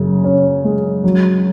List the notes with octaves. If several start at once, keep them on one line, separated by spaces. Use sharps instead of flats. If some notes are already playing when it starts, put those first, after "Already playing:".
Already playing: F#2 C#3
C#4
G#3
F#3